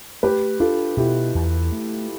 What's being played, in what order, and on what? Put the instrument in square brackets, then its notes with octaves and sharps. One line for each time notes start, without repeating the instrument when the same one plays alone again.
[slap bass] A3 [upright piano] G4 B4
[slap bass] D4 [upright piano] F4 A4
[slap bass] B2 [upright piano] E4 G4
[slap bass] E2
A3